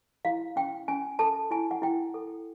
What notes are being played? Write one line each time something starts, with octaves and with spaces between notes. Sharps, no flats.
E4 F5
C#4 G5
C#4 G#5
A4 A5
E4 G#5
F#5
E4 G5
A4